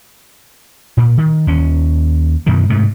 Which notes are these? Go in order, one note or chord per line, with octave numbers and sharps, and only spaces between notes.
A#2
D#3
D#2 C#4
F#2 B2 D#3 E3
G#2 C3 A3